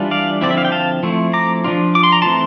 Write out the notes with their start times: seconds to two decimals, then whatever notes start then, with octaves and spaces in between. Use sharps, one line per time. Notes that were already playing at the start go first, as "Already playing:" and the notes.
Already playing: E3 G3 D4 F4
0.11 D5 F5
0.41 D3 F3 C4 E4 D5
0.51 E5
0.57 F5
0.65 G5
0.72 F5 A5
1.03 F3 A3 C4 E4
1.33 A#5 D6
1.64 F3 A#3 D4 F4
1.95 D6
2.03 C6
2.12 A#5
2.22 E3 A3 C4 A5 C6